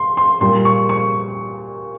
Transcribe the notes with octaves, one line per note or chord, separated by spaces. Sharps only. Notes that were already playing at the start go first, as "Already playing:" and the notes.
Already playing: C6
C6
A#2 G3 C6
C#6
C#6